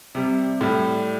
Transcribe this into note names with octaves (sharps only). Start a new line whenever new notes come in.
C3 G3
A2 G3